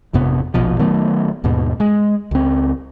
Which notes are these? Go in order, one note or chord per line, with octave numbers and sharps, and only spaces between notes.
G#1 F2 C3 B3
F1 A#1 B2 F3
D#3 F#3 A3 B3
D#2 G#2 B2
G#3
C#2 C4